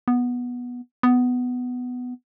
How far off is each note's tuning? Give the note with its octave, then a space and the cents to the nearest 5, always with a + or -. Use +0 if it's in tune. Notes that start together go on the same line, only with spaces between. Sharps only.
B3 -10
B3 +10